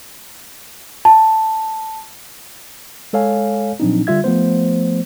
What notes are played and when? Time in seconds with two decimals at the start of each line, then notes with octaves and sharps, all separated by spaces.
1.05 A5
3.13 G#3 A4 C#5 F5 G#5
3.80 A#2 F3 F#3 C4 D4 D#4
4.07 D3 G3 F4 E5 G#6
4.24 F3 A3 B3 C5